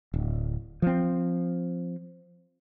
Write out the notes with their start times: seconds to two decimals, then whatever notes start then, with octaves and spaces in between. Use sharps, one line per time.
0.14 D1
0.82 F3 C4